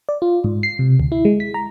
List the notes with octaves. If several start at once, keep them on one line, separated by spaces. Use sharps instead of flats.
D5
F4
G#2
C7
C3
D2
E4
G#3
B6
A#5